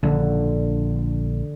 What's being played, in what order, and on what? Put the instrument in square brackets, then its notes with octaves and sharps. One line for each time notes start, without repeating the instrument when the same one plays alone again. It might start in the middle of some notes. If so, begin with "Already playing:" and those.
[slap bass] A#1 [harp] D3